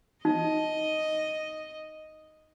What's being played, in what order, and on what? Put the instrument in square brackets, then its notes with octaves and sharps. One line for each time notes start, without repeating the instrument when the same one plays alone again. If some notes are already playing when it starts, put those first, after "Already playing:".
[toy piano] D#4 [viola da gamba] D#5